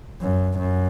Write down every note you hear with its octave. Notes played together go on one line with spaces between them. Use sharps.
F#2
F#2